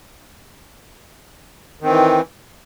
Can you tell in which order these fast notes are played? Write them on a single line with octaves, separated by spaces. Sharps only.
D#3 C4 E3